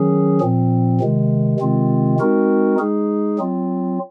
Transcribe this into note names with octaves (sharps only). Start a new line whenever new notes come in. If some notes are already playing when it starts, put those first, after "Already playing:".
Already playing: D#3 F#3 C#4 G#4
A#2 F3 C4
C3 D#3 G#3
C3 D#3 G#3 C4 F4
G#3 C4 D#4 F#4 A#4
G#3 D#4 G#4
F#3 C4 F4